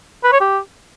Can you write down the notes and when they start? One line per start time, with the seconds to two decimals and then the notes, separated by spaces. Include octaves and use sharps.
0.24 B4
0.32 C#5
0.41 G4